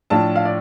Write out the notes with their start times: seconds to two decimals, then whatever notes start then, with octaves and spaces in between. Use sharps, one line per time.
0.10 A2 F3 D4 F4 A5
0.36 F5
0.45 D5